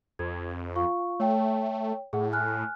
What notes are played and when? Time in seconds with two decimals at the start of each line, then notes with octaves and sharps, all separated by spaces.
0.19 F2 G#6
0.76 F4 F5 C#6
1.20 A3 C#5 G5
2.13 A2 G#4 F#5
2.32 G#5 F6 F#6